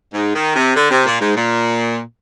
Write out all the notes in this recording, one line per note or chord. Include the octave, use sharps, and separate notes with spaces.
G#2
D#3
C3
D3
C3
A#2
G#2
A#2